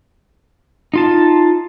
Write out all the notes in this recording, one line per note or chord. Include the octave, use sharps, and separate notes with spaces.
D#4 F4 A5